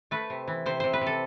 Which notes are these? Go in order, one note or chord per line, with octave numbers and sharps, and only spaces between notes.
A3 B4
C3
E3
C3 C5
C3 C5
B4
C3
A4